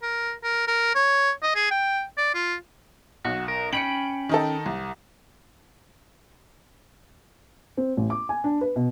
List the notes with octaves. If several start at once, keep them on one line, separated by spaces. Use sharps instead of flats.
A#4
A#4
A#4
C#5
D#5
G#4
G5
D5
F4
B1 F#4
A#4
C#4 G5 B5 C#7 D7 F#7
D#3 D#4 A4
C2
C4
A1
D6
G#5
D4
B4
B2